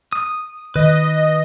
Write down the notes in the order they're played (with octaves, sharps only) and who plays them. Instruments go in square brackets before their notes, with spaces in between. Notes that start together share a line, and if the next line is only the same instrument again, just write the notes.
[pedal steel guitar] D#6
[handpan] D#3 [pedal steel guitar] B4 [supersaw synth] D#5